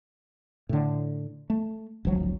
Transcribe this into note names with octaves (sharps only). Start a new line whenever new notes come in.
A2 D3
A3
D1 G#1 F3 F#3